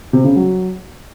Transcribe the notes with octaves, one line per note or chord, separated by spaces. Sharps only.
C3
C#3
F#3